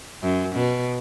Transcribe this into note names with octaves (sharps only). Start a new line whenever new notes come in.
F#2
B2